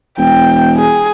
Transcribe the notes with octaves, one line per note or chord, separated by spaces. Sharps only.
E1 G5
G#4